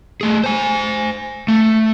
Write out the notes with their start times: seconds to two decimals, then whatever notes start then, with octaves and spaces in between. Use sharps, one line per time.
0.21 A3 G#4
0.44 C5 G#5
1.48 A3